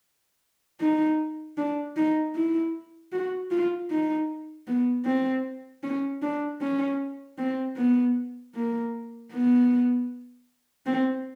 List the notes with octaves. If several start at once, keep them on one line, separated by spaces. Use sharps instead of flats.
D#4
D4
D#4
E4
F#4
F4
D#4
B3
C4
C#4
D4
C#4
C4
B3
A#3
B3
C4